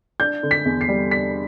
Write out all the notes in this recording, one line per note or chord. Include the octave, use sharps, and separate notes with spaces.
D4 G6
D3
B6
E2
C7
G3
D4 B6